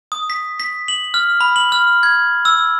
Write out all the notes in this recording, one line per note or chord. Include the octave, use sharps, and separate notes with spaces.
D#6
B6
B6
F#7
F6
B5
F#7
F6
G#6
E6